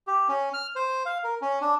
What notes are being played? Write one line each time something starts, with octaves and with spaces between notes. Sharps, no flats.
G4
C#4
F6
C5
F5
A#4
C#4
D4